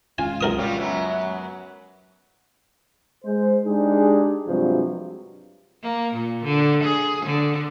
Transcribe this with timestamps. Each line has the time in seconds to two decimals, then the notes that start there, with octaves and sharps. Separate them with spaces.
0.18 C#2 F4 G#5
0.41 B1 A#4 D#6
0.58 F#3 G3 F4
0.77 F#2 F#3 B3
3.25 G#3 C5
3.65 G#3 D4 D#4 G4 G#4
4.47 G2 C3 F3 F#3 G#3
5.83 A#3
6.13 A#2
6.44 D3
6.83 G#4
7.25 D3